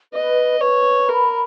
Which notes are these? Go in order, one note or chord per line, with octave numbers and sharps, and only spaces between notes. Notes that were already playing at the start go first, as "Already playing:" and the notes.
B4 D#5
B4 C#5
A#4 B5